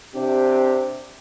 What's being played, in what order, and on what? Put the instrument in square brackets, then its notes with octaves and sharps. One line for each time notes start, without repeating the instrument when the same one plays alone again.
[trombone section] C3 C4 D4 G4